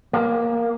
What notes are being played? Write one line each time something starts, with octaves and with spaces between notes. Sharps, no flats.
A#3